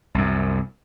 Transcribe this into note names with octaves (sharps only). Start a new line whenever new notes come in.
C2 F#2